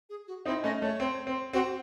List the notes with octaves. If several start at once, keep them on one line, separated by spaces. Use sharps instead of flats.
G#4
F#4
C4 D#4 E4
A3 C#4 D#5
A3 C#5
C4
C4
C4 F#4